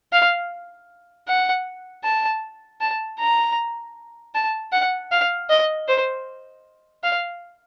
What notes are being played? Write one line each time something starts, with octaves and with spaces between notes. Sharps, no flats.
F5
F#5
A5
A5
A#5
A5
F#5
F5
D#5
C5
F5